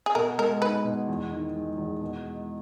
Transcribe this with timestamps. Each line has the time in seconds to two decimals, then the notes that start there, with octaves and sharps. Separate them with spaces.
0.06 G#4
0.15 B2 A#4
0.38 G#3 A#4
0.61 D#4 B4
0.84 B2
1.08 E2
1.32 D#3
1.55 G#3
1.78 E2
2.01 B2
2.25 G#3